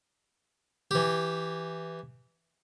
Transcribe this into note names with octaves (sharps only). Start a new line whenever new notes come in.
E3 G4